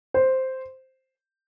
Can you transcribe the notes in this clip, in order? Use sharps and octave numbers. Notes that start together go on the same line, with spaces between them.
C5